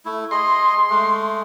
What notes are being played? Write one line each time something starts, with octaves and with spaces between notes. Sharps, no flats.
A3 E4
G#4 D#5 C6
G#3 A3